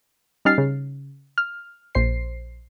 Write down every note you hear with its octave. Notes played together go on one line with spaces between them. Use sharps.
G3 C#4 D#4 F6 A6 C7
C#3
F6
A#1 C5 C7